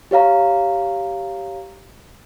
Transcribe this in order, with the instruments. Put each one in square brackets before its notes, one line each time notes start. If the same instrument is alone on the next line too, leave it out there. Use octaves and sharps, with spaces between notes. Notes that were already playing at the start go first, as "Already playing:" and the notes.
[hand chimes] G4 C#5 F5 A#5